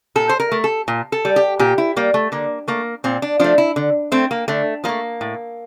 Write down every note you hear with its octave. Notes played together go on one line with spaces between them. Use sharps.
A#2 A4
C5
A#4
A3
A4
A#2
A4
G3
G4
A#2 G4
E4
G3 A#3
A3
D3 A#3
A3 A#3
A#2 C4
D4
F3 A3 D4
E4
D3
A3 C4
A#3
D3 A3
F3 A3 A#3
A2